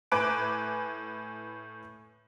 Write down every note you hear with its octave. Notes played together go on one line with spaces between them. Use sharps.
A2 B4 G#5 D6 F#6 D7